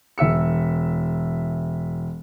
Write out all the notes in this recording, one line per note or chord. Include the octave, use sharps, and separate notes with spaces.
E1 E5 E6 C#7